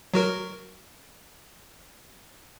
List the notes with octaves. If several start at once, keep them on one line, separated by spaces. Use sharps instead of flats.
F#3 F#4 A#4